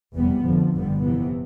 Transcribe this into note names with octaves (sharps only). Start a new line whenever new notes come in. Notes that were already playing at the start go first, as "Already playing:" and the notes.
F1 E2 C3 G3 B3
F1 F2 D3 F3
G1 F2 D3 G3 B3
F2 C3 E3 B3